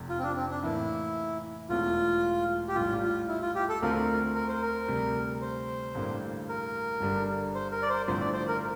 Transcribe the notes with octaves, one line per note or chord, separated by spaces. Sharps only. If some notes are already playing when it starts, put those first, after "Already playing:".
Already playing: F1 F2 C3
F4
C4
D4
C4
D4
A2 E3 A#3 E4
E1 E2 E3 A3 F4
G4
A#1 A2 G3 F4
F4
E4
F4
G4
A4
D2 D3 A3 C4 F4 A#4
A#4
C5
A#4
D2 C3 G3
C5
A1 G2 D3 G3 A#3
A#4
G1 G2 D3 G3 D4
C5
A#4
D5
C5
A1 G2 D3 F3 A3 C5
D5
C5
A#4